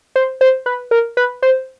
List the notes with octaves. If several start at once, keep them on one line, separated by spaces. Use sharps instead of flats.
C5
C5
B4
A#4
B4
C5